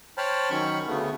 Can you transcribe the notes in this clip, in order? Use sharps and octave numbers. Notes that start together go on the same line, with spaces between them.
C5 C#5 G5 A5 B5 F6
D#3 F#3 C#4 B5 C#6
D2 C#3 A3 B3